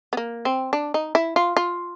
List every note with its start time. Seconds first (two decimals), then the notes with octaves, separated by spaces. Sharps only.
0.13 B3
0.17 A#3
0.45 C4
0.73 D4
0.94 D#4
1.15 E4
1.36 F4
1.57 F4